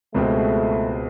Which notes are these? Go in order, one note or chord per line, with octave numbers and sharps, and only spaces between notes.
C#2 B2 G#3 A3 C4